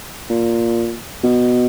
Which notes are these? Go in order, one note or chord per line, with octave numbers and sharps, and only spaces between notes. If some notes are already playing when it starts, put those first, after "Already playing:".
A#2
B2